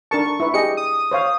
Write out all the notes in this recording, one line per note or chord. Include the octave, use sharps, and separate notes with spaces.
D4 A#4 A5 C#6
E4 B4
G4 G#4 D#5 C#7
D#6
C5 C#5 F5